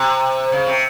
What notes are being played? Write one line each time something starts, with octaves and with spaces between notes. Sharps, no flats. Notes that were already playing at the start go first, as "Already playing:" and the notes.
Already playing: C3
C#3
C3